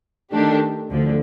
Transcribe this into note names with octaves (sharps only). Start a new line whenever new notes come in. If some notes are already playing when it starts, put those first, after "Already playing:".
D#3 A3 D4 G4
D2 D3 F3